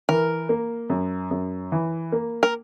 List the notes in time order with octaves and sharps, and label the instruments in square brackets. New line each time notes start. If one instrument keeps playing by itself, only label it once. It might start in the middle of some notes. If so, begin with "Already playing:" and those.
[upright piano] E3 [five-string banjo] A#4
[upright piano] A#3
F#2
F#2
E3
A#3
[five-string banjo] A#4